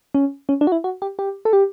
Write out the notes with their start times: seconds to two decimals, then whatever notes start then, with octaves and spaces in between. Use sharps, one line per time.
0.14 C#4
0.49 C#4
0.61 D4
0.67 F#4
0.72 E4
0.84 F#4
1.02 G4
1.19 G4
1.45 A4
1.53 G4